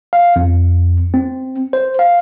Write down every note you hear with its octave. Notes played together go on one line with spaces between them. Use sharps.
F5
F2
C4
C5
F5